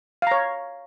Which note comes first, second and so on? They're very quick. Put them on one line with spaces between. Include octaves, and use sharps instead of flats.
F5 A#5 C#5